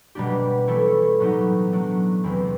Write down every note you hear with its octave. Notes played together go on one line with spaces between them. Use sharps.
B2 G3 A#3 D4 G4
E3 A3 C#4 E4 A4
A2 F#3 B3 D#4 G4
F#3 A3 D4
E2 C3 E3 G#3 C4